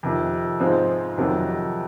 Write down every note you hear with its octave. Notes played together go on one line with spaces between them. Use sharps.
F2 C3 D#3
G#2 F3 G#3 C4
F2 C3 D#3 F#3